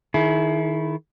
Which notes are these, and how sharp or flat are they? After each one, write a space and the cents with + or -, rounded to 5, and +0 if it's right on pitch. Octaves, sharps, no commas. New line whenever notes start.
D#3 +0 E4 -5 G#4 +35